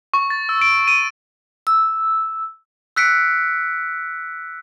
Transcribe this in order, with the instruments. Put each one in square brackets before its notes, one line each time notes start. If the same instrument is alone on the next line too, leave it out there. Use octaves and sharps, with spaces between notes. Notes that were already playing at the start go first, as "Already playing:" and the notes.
[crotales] C#6
A6
E6
D7
D#7
[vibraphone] E6
[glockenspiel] E6 F#6 B6 C#7 D7